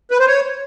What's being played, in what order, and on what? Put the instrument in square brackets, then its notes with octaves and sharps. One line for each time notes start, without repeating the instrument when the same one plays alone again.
[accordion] B4
C5
C#5